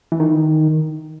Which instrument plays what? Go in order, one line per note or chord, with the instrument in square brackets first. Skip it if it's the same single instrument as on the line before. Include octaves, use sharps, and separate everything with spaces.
[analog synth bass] E3
D#3